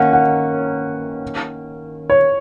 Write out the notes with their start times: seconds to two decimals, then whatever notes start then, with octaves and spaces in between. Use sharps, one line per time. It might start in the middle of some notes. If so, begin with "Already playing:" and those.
Already playing: D#3 A#3 C#4 F#5
0.13 F#5
2.10 C#5